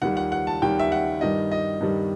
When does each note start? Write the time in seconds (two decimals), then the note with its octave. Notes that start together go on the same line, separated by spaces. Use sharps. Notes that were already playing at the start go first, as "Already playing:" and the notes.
0.02 D#2 D#3 G3 F#5
0.17 F#5
0.32 F#5
0.47 A5
0.62 D#2 D#3 G3 G5
0.79 E5
0.92 F#5
1.21 G2 D#3 G3 D#5
1.51 D#5
1.81 G2 D#3 G3